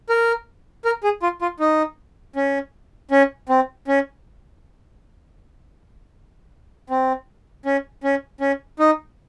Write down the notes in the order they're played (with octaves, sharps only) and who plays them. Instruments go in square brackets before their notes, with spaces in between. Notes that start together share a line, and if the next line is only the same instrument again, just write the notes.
[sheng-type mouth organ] A#4
A#4
G#4
F4
F4
D#4
C#4
C#4
C4
C#4
C4
C#4
C#4
C#4
D#4